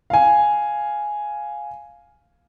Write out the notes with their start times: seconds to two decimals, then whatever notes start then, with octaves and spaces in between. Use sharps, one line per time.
0.10 F5 G#5